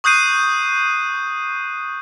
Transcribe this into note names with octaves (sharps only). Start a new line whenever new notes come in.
C#6 D#6 F#6 G6 C7 D#7